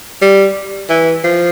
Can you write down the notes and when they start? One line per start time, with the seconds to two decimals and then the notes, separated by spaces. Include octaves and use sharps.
0.22 G3
0.89 E3
1.24 F3